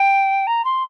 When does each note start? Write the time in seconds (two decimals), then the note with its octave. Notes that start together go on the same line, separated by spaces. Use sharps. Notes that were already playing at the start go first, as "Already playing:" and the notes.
Already playing: G5
0.47 A#5
0.64 C6